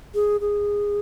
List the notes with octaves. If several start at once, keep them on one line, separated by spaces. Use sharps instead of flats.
G#4
G#4